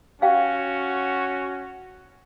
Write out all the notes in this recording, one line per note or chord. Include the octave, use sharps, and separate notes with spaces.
C#4 F#4 F5 G5